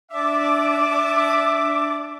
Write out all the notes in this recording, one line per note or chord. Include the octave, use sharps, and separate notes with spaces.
D4 E5 D6